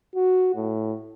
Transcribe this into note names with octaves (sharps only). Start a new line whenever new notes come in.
F#4
A2